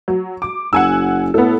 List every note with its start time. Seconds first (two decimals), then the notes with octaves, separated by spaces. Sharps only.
0.08 F#3
0.42 D6
0.73 F#1 F#5 G#5 E6
1.34 A2 B3 A4